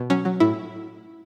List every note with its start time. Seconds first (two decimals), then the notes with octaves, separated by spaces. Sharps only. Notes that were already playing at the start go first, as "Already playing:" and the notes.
Already playing: B2
0.10 F#3 C#4
0.25 F#3
0.40 A2 E4